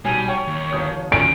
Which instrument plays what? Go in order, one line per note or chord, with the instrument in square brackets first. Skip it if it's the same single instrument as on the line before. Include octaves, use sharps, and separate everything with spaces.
[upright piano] B1 [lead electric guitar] G3 [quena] G#5
[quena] C#5 [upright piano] G5 A5
[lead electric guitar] D#2
[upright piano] G1 D#6 G6
[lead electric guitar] D#3 C#4 [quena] G#5 [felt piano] D7